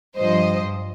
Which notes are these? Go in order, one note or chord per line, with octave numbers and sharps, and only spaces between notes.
G2 F3 C5 D#5